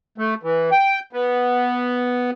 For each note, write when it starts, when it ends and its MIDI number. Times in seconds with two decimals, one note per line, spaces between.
0.18 0.34 57
0.43 0.70 52
0.72 0.99 79
1.13 2.31 59